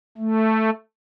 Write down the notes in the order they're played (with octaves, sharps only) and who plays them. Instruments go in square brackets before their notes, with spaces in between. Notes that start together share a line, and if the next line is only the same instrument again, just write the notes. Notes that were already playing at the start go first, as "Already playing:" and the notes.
[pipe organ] A3